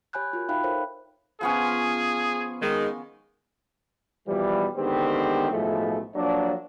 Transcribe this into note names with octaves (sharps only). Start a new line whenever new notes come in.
G4 C#5 G#5 B5 F#6 G6
F4 F#4 A#4
D#4 E5 F5 G5 B5 F#6
A4 A#4 C5 C#5 F5
F3 B3 C#4 G#4
D#3 G#3
B2 E3 F3 G3
D3 D#3 G#3 B3 C4 G4
B1 A2 F3 G#3 A3
F3 F#3 A#3 D4